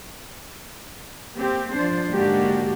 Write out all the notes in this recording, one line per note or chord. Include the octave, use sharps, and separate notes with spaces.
A#3 C4 G4
F3 D4 C5
G#2 D3 A#3 D4 F#4 G4